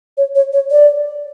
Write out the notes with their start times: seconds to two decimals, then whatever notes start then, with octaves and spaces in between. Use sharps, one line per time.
0.17 C#5
0.35 C#5
0.53 C#5
0.71 D5